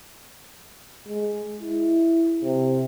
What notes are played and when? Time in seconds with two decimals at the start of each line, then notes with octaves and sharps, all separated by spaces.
1.08 G#3
1.61 E4
2.43 C3